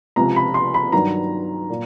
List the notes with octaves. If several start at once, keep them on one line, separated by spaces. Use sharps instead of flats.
C#2 C3 F3 A#5
B5
C6
B5
G2 D#3 F#3 A#5
A#2